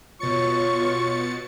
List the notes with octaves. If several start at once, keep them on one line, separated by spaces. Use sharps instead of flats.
B2 F4 C#5 C#6 A6 C#7